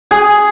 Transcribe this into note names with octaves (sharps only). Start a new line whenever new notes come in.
G#4